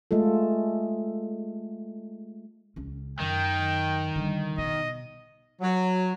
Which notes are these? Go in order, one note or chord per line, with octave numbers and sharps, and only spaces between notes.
G#3 A3 F4 A4
C#2 C#4
F#2 D#3 G5
D3 G3
B2 D#5
F#3